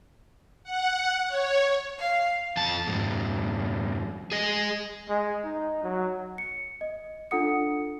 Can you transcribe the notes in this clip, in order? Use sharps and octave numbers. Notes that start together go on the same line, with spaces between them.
F#5
C#5
F5
F2 A5
F2 G#2
G#4 D#5
G#3
D#4
F#3
C#7
D#5
D4 F4 A4 F#5 D#6 C#7